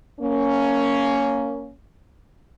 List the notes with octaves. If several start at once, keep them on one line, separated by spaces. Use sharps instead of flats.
A#3 C#4